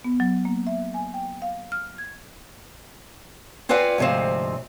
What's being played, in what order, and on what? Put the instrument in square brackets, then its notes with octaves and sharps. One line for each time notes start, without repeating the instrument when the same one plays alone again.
[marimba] B3
F#3
A#3
E5
G#5
G5
F5
F6
G#6
[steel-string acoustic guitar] C4 F4 B4 D5 F#5 G#5
D2 G#2 C3 F3 C4